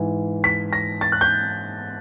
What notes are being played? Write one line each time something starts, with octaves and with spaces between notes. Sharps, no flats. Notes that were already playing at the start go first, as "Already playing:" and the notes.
Already playing: G#2 E3
B6
A#6
A6
F#6
G6